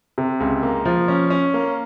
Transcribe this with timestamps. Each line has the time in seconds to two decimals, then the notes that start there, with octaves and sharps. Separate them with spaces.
0.18 C3
0.40 C#2
0.63 A#3
0.85 F3
1.08 C#4
1.30 C#4
1.54 A#3